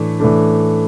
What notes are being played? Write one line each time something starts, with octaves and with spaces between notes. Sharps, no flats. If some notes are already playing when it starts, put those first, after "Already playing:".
Already playing: A2 E3 A3 D4
A2 E3 A3 D4